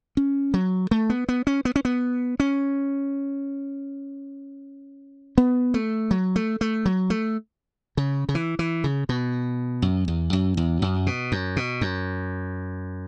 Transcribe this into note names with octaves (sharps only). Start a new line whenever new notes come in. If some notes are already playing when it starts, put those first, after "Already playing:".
C#4
F#3
A3
B3
B3
C#4
B3
C#4
B3
C#4
B3
A3
F#3
A3
A3
F#3
A3
C#3
C#3
E3
E3
C#3
B2
F#2
E2
F#2
E2
F#2
B2
F#2
B2
F#2